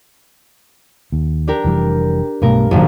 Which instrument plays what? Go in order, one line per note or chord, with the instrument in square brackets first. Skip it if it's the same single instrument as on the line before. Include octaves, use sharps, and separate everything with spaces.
[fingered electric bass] D#2
[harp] D4 G4 A#4
[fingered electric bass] F1 E3 G3
[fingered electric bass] B1 B2 A3 [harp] G2 A#4
[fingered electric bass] F1 [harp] A#1 F#2 D#3